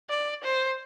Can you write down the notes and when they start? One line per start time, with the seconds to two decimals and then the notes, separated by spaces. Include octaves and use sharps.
0.10 D5
0.44 C5